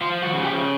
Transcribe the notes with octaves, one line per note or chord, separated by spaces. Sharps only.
F3 F4
F#4
C#3
G4